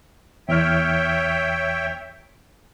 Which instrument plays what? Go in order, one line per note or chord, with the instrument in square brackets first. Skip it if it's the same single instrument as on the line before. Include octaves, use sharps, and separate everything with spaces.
[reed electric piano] E2 F6 [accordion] C#5 E5 G5